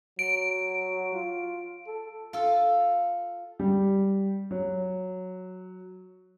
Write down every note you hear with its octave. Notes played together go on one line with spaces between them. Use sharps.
F#3 D7
F4
A4
F4 A4
G3
F#3